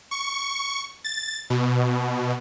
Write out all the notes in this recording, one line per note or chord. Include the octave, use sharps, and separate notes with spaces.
C#6
A6
B2